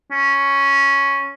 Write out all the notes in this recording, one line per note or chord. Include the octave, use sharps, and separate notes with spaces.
C#4